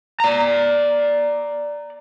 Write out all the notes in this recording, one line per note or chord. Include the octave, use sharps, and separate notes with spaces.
D5 A#5